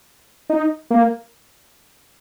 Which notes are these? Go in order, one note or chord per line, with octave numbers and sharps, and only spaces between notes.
D#4
A#3